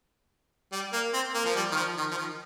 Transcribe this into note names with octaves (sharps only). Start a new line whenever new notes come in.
G3
A#3
C4
A#3
F3
G3
D#3
F3
D#3
F3
D#3